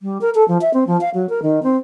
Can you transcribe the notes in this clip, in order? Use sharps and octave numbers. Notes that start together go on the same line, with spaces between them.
G3
A#4
A4
F3
E5
C4
F3
F5
F#3
A#4
D#3
C4